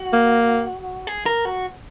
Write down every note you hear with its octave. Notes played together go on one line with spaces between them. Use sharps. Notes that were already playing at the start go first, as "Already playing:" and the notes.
Already playing: F#4
A#3
G#4
A#4
F#4